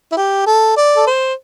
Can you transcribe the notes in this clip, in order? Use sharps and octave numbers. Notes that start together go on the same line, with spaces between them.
E4
G4
A4
D5
A4
C5